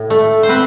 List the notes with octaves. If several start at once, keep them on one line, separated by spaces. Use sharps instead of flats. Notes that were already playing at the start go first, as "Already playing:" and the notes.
Already playing: A2
A3
C5
C4 B4